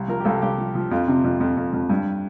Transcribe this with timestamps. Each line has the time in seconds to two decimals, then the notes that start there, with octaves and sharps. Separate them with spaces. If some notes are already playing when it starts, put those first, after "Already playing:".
Already playing: C2
0.08 F3 A#4
0.20 G4
0.25 C2 A4
0.42 C2 G4
0.58 F3
0.75 F3
0.91 F2 F4
1.08 C3
1.24 F2
1.40 F2
1.57 F2
1.73 F2
1.90 G2